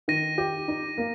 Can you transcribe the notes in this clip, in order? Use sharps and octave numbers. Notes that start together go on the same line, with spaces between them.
D#3 A#6 D#7
G4
D#4
A#3